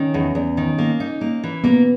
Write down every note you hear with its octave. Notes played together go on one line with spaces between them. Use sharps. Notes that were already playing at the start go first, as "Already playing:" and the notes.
Already playing: D#3 C#4
E2
E2
D#3
A#3
D#4
A#3
E3
A#3 B3